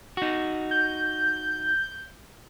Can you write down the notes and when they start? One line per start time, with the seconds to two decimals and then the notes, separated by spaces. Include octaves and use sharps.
0.17 D#4 F#4
0.71 G6